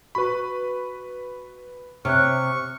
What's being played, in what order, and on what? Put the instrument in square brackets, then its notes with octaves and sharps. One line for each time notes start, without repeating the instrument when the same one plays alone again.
[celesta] F#4 C#6 [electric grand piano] B4 B5
[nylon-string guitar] C3 C#5 [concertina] C#6 [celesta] F6 F#6